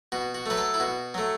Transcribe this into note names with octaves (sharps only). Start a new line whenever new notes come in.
B2 F#4
F#4
F#3 A3 B4
A4
E4
B2 F#4
F#3 A3